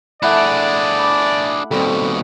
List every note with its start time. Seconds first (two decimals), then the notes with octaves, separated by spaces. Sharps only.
0.23 A3 D4 E4 G#4 D5 F#5 B5
0.99 B5 D6
1.71 D#2 B2 G3 C4 A4